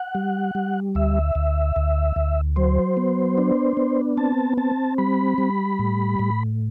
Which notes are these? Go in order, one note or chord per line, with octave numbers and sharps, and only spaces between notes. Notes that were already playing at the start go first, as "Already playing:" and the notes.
Already playing: F#5
G3
G3
D2 E5
D2
D2
D2
F#3 C5
B3
D4
B3
C4 A5
C4 A5
G3 B5
G3
A2
A2